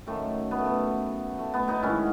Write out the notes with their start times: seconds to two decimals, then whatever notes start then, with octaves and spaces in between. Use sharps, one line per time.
0.07 F#2 D#3 F#3 A3
0.51 B3
0.59 A3
0.66 B3
1.39 A3
1.54 B3
1.68 B3 D#4
1.82 G#2 D#3 G#3 C#4 E4